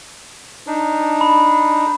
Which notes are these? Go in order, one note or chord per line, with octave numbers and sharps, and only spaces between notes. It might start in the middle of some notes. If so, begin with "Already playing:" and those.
D4 D#4
B5